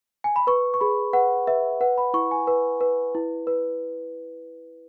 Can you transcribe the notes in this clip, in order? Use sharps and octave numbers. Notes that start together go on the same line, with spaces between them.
G#5
B5
B4 C#6
C#6
G#4 B5
B4 F#5
B4 E5
B4 F#5
B5
E4 C#6
G#5
B4
B4
E4
B4